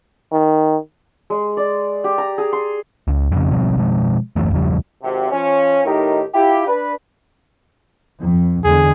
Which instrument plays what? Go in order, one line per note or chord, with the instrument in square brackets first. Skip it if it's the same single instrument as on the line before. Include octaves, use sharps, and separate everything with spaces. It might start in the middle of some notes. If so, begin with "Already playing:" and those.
[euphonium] D#3
[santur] G#3
D5
G4
A#5
G#4
C6
[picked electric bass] C#2
F2 C#3
B2 F3 G3 C4
B2 F3 G#3
D1 F#2 E3 A3
E2 C#3 F3 G3
[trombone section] G#1 C3
F3 C#4
A2 D#3 D#4 G4 A#4
E4 F4 G4
D4 B4
[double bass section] F2
[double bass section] E2 D3 G#3 [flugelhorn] G#4